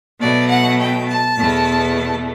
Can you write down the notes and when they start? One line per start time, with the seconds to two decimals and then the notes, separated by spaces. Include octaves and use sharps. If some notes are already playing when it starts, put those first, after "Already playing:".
0.20 B2 F#3 A3 D5
0.49 F#5
0.79 G5
1.07 A5
1.37 E2 B2 A3